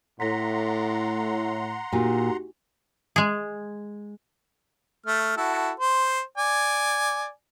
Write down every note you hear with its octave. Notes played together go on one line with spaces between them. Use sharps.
A2 F#5 A#5 C6 A#6 B6
A#2 D#4 F#4 G4
G#3 G#4
A3 F6
E4 F#4 A4
C5
D5 G#5